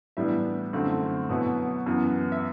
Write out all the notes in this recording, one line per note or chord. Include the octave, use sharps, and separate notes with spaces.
A2 E3 G3 B3 D4 E5
F#2 D3 A3 C4 E4
B2 F#3 B3 E4
F#2 E3 B3
E5